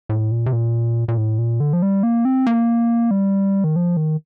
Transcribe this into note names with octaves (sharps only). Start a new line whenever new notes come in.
A2
A#2
C3
A#2
A#2
A2
A#2
D3
F3
G3
A#3
C4
A#3
G3
D#3
F3
D#3